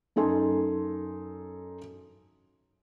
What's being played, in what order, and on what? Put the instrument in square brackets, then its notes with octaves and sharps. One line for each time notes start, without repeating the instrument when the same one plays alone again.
[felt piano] F#2 D#4 A4 G#5 C6